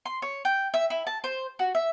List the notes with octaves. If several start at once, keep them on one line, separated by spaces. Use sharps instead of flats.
C6
C#5
G5
E5
E4
A5
C5
F#4
E5